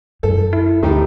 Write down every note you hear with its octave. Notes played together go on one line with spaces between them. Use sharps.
F#2 A4
E4
D2 A2 D#4 G4